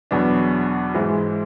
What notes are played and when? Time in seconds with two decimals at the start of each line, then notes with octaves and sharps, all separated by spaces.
0.11 E2 B2 F#3 B3 D4
0.94 G#2 E3 G#3